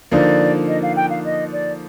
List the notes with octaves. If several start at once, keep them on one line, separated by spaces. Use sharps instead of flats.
D3 F3 A#3 D#4 D5
D#5
F5
G5
F5
D#5
D5